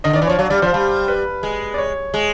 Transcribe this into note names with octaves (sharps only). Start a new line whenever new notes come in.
D3 D#5
D#3 D5
E3
F3 C#5
F#3 D5
G3 D5
F3 C5
G3
B4
G#3
D5
C#5
G#3